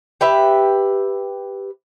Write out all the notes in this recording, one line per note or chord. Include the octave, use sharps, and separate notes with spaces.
G4 B4 E5